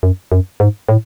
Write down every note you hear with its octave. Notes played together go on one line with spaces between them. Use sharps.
F#2
F#2
G#2
A2